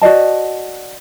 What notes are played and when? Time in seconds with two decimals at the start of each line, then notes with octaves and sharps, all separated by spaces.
0.02 F#4 D5 D#5 A5